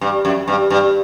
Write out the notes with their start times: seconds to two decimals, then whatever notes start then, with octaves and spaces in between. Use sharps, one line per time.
0.01 G2
0.25 F#2
0.48 G2
0.70 G2